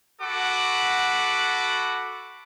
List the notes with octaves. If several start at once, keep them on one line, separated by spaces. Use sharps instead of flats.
F#4 A4 F#5 B5 D6